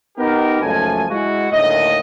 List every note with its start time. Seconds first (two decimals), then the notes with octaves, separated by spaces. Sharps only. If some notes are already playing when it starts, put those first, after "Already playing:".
0.18 B3 D#4 G4 A#4
0.62 C#2 F#2 F3 A3 A4 G#5
1.10 G#3 E4 F#4
1.52 D2 A2 D#3 A#3 D#5